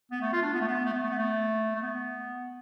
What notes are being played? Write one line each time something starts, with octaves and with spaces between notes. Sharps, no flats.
B3
A3
F4
D4
B3
A3
B3
A3
B3
A3
B3
A3
A3
B3